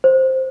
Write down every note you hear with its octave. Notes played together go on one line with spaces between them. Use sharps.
C5